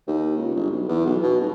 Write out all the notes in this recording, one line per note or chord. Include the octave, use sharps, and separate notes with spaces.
D#2
C#2
G1
B1
E2
B1
B2
D#1